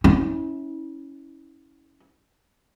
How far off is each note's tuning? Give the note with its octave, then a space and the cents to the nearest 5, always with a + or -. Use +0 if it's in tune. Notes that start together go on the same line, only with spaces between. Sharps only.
C#4 +0 E4 -30